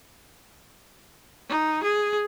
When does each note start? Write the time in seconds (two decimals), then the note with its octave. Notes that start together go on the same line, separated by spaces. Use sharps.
1.48 D#4
1.82 G#4